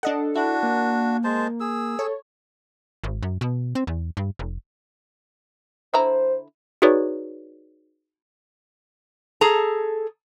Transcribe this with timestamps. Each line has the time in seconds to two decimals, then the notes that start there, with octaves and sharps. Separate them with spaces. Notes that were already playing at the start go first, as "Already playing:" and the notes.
0.03 D4 A4 D#5 F#5
0.36 D4 E4 F#4
0.63 A#3
1.24 G#3 C5 A5
1.60 G#4 E6
1.99 A4 C#5
3.04 G#1
3.23 F#2
3.41 B2
3.75 C4
3.87 E2
4.17 G2
4.39 F1
5.94 D3 E4 C5 A#5
6.82 D#4 F#4 G#4 B4 C#5 D5
9.41 G#4 A4 A#5